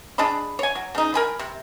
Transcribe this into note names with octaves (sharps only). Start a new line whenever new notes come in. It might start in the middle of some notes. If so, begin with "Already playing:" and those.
D4 G#4 D#5 B5
C#5 G#5
F#3
C#3 D#4
A#4 G#5 B5
C3